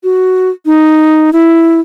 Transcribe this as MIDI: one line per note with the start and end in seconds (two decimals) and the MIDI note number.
0.04 0.50 66
0.66 1.30 63
1.33 1.80 64